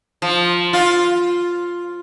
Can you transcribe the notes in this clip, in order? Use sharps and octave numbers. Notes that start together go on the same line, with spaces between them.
F3
F4